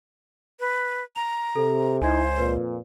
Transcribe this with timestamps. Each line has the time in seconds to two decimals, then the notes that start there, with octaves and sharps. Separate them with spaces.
0.60 B4
1.16 A#5 F7
1.56 C3 A4
2.02 C#2 D#4 E4 C5 G#5 G#6
2.38 F2 A#2 B4